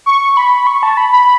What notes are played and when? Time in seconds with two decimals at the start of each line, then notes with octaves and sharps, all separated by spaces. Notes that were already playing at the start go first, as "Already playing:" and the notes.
0.06 C#6
0.32 C#6
0.37 B5
0.67 C#6
0.83 A5
0.97 B5
1.13 B5